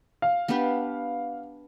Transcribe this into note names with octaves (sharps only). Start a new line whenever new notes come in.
F5
B3 D4 G4 B4